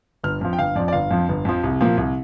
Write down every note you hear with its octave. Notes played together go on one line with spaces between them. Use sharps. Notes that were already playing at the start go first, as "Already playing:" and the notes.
G1 F6
F2 F3
G5
G1 F5
F2 F3 D5
D5
G1 F5
F2 F3
G1
F2 F3
C2
A#2 F3
C2